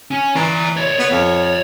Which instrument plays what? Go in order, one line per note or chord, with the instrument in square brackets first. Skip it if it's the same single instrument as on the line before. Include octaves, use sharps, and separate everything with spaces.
[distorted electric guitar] C#4
[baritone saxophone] E3 [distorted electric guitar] D5 A#5
[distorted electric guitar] C#5 D5
[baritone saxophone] B3
F2